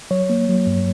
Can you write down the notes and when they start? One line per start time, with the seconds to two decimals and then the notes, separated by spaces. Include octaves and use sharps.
0.11 F#3 C#5
0.30 A#3
0.49 F#3
0.67 G2